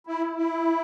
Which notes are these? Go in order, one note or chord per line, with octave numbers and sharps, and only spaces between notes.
E4
E4